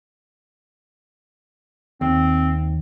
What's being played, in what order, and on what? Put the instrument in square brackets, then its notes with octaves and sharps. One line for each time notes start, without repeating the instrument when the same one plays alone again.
[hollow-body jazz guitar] D#2 [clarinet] C4